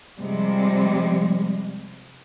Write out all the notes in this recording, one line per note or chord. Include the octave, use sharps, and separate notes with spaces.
C3 F3 G3 G#3